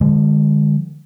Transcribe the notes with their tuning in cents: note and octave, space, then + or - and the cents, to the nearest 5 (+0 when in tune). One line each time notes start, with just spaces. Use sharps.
D3 +30 F3 +0 G#3 -20